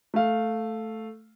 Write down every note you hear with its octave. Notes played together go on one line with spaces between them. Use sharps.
A3 F5